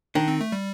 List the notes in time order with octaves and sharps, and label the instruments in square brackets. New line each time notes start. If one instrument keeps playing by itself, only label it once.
[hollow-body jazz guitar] D#3 [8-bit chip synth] D4
[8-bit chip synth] C4
A3
G3